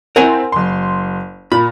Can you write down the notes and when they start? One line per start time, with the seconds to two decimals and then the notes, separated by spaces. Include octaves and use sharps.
0.16 C4 E4 A#4 F#5 G#5
0.52 F#1 C6
1.52 A#2 B5